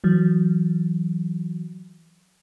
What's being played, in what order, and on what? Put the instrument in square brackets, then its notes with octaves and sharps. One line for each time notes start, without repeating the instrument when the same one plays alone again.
[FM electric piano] E3 F#3